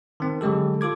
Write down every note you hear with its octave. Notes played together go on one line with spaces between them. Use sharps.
D#3 C4
D3 F#3 G#3 G4 A4
F4 A4 D6 G#6